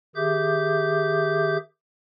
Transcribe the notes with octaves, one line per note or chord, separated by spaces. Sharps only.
D#3 G4 G#4 E5 D6 G6